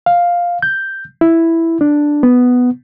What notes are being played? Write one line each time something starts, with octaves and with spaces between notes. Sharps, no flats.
F5
G6
E4
D4
B3